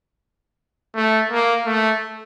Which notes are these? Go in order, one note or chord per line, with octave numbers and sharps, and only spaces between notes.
A3
A#3
A3